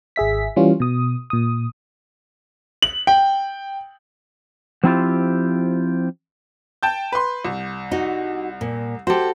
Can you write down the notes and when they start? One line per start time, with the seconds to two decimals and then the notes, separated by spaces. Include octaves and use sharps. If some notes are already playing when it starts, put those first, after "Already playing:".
0.16 G#1 G#4 E5 B6
0.56 E3 G3 C#4 F4
0.80 B2 D#6
1.30 A#2 D#6
2.82 F#7
3.07 G5
4.84 F3 C4 E4 F4 G4
6.83 G5 A5 G6
7.12 B4 C6
7.45 C2
7.91 D#4 F#4
8.61 A#2
9.07 F#4 G4 A4 C5